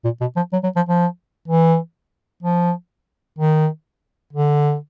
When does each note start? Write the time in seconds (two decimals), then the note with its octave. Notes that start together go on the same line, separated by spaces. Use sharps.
0.05 A#2
0.21 B2
0.36 F3
0.53 F#3
0.64 F#3
0.76 F3
0.89 F3
1.48 E3
2.43 F3
3.39 D#3
4.33 D3